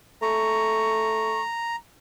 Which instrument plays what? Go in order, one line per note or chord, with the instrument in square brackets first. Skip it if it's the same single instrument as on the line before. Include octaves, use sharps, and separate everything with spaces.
[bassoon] A3 [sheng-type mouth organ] A#5 [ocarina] C#6